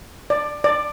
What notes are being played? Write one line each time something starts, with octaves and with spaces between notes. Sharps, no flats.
D5
D5